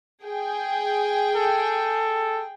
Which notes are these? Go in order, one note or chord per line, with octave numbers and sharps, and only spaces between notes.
G#4 G5
A4